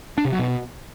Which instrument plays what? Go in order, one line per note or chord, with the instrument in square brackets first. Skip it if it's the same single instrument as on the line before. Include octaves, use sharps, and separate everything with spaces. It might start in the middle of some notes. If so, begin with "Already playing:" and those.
[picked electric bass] D4
C3
F#3
B2